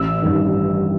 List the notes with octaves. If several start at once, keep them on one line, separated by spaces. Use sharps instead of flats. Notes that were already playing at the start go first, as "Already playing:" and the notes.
Already playing: A1 E6
G2 D#3